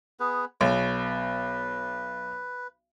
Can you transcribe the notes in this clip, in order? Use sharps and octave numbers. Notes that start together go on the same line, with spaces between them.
B3 G#4 B4
B1 B4